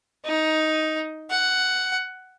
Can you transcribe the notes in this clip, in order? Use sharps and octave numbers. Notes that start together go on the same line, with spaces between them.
D#4
F#5